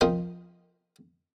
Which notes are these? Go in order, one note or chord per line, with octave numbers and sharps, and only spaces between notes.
F3 C4 D#4 A#4 C5